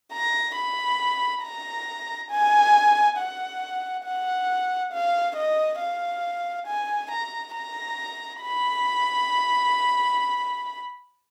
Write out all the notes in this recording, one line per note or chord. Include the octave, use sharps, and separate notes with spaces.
A#5
B5
A#5
G#5
F#5
F#5
F5
D#5
F5
G#5
A#5
A#5
B5